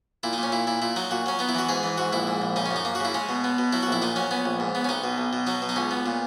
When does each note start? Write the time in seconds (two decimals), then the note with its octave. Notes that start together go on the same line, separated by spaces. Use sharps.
0.23 A#2 E4
0.33 D#4
0.38 A#2
0.43 C#4
0.52 A#2 E4
0.67 A#2 E4
0.82 A#2 E4
0.96 F#3 D#4
1.11 A#2 F#4
1.26 F#3 C#4
1.39 B3 D#4
1.49 E4
1.55 E3 F#4
1.69 G#2 G#4
1.83 E3
1.98 G#2 F#4
2.12 A#1 E4
2.27 G#2
2.42 A#1
2.56 C#3 D#4
2.66 C#4
2.71 F#2
2.76 D#4
2.85 A#3
2.95 F#4
3.00 C#3 E4
3.14 G#3 C#4
3.29 B2
3.44 B3
3.58 B2
3.73 F#3 E4
3.83 F#4
3.87 A#1
3.92 E4
4.02 A#2 D#4
4.16 F#3 C#4
4.31 B3 C#4
4.45 A#1
4.60 G#2
4.75 B3
4.84 C#4
4.89 B1 D#4
5.04 B2
5.18 B1
5.33 B2
5.47 F#3 D#4
5.62 B2
5.69 D#4
5.76 C#2 C#4
5.91 B3
6.06 A#2